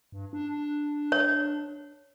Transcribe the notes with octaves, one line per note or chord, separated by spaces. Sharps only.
G2
D4
C#5